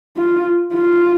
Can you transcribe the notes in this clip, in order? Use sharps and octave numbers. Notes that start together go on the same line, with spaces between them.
F4
F4